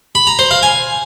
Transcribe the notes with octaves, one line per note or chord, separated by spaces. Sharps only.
B5
A#5
C5
F5
G#5